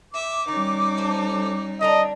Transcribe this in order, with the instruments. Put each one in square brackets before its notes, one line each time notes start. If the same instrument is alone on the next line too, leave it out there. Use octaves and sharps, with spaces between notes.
[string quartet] E5 [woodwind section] D6
[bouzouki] D#3 [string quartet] G3 C#4 D#4
[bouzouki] A3 C5
[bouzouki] D3 D4 A#5 [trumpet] D#5